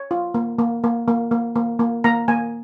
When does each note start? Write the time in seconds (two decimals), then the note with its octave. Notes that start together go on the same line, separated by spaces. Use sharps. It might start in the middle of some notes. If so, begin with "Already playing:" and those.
Already playing: C#5
0.11 F4
0.34 A#3
0.59 A#3
0.84 A#3
1.08 A#3
1.31 A#3
1.56 A#3
1.79 A#3
2.04 A#3 A#5
2.28 A#3 G#5